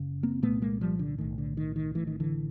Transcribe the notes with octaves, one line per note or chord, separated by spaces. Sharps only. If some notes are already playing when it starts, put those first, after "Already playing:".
Already playing: F#1 C#3
A#3 C4
C2 A#2 A3 B3
G#3 A#3
F3 G3
D3
B1 A2 D#3
D3
D#3
D#3
A1 A2 E3
D#3
D3 E3